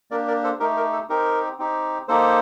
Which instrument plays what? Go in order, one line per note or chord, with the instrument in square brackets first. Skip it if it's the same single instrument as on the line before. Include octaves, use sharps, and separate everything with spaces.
[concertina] A#3 D4 G4 A#4 D5
A#4 D5
A4 C5
A3 D#4 G4 A#4
A#4
A4
C4 D#4 G4 A#4
C4 D#4 G4
A#3 D#4 G4 A4 C5